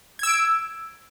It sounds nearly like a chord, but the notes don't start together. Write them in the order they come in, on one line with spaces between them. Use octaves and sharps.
G#6 E6 D7